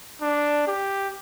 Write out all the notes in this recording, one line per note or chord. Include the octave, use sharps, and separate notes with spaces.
D4
G4